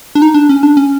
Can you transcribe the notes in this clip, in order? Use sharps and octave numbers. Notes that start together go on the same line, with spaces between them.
D4
D#4
D4
C#4
D4
C#4